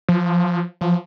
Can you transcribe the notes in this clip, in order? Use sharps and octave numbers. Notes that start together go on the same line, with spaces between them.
F3
F3